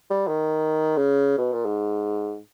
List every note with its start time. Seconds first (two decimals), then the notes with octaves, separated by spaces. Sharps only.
0.11 G3
0.28 D#3
0.97 C#3
1.38 B2
1.52 A#2
1.65 G#2